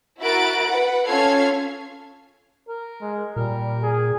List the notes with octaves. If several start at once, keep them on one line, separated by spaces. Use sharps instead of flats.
E4 F#4 A#4 F#6 A6 D7
B4 F#5
C#4 F4 A4 F6 G#6 C7
A#4
G#3
A#2 G3 A#4
G#4